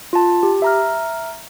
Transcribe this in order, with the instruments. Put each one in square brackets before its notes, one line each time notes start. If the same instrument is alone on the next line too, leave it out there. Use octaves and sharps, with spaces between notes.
[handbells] F4 A5
G4
E5 A#5 F6